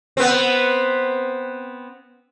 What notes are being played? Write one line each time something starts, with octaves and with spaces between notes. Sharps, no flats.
B3 C4